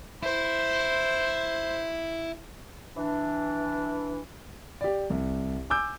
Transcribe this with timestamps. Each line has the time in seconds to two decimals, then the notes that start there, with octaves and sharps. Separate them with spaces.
0.23 E4 C5
2.96 E3 D4
4.81 G4 D5
5.10 C2
5.70 G#5 D6 E6 G6